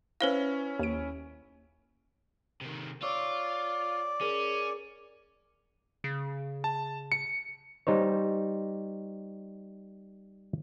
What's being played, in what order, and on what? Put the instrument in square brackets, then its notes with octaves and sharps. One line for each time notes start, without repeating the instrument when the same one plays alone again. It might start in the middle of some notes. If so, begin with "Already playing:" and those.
[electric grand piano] C#4 E4 [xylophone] B4 C5 F5
[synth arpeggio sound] D#2 D7
[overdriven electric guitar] C3 D#3
[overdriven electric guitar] F4 [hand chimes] C#5 C#6 E6 [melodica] D5
[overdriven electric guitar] C#4 [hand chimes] G#4 A#4
[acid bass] C#3
[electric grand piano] A5
C#7
[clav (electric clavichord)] G3 D#4 C5 C#5